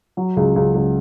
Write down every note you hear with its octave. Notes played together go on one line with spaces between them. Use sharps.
F#3
C#2
C#2
C#2